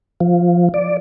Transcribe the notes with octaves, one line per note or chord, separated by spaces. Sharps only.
F3
D5